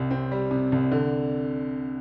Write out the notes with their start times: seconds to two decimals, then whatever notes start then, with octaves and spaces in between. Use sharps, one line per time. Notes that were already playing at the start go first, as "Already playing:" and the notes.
Already playing: C2 C3
0.11 C4
0.32 G3
0.51 C3
0.72 C2
0.92 D3